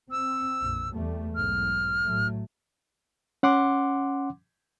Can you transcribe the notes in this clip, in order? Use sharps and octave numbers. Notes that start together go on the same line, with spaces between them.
C4 E6
A#1 F2
E2 G3 A3
B1 G#2 F6
A2 F#3 A3
C#4 F#5 C6 D6